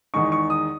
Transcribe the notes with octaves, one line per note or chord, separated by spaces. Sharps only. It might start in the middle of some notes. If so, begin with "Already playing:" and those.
E2 D#3 G#3 D#4 C#6
C#6
D#6